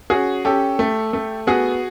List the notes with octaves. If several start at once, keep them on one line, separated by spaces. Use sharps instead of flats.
C#4 F#4 G#4
C#4 G4 A4
A3
A3
B3 F#4 G#4